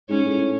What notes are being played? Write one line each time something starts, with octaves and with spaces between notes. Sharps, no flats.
G#2 C#4
A2